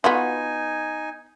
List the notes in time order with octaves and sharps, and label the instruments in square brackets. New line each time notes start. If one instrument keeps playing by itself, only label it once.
[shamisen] B3 F4 F#4 [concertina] D#4 G#5